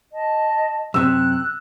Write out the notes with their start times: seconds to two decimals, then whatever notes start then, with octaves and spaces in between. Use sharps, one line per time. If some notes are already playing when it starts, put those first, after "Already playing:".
0.11 D#5 A5
0.94 F#2 C3 E6 F#6